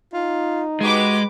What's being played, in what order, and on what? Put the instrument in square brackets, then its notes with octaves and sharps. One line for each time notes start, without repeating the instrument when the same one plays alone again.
[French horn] D#4 [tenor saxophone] F4
[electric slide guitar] G#3 [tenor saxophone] F#4 [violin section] G4 B4 D6